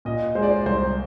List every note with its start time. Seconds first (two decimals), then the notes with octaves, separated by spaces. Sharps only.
0.05 A#2 D#5
0.35 G#3 C5
0.43 D5
0.51 C5
0.66 C2 C5